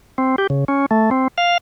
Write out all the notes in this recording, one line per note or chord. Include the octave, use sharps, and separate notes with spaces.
C4
G4
C#3
C#4
A3
C4
F5